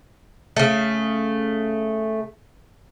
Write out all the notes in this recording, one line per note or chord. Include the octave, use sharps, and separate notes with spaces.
C#3 A3